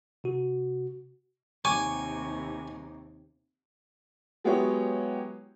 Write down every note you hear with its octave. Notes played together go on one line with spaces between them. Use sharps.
C3 F#4
D#2 C3 G#5 C#6 D6
F#3 G#3 B3 E4 G4 C#5